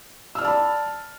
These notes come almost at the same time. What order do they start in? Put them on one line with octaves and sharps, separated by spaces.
E6 F6 D5 A5 B5